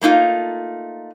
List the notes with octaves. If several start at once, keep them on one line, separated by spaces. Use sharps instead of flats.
A3 A#3 D#4 F4